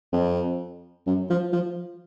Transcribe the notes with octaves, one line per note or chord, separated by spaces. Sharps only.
F2
F#2
F3
F3